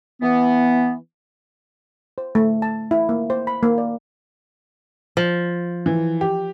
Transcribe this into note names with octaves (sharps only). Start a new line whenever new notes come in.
E3 B3
C5
A3
A5
E4
A#3
C5
B5
A#3
D5
F3
E3
G4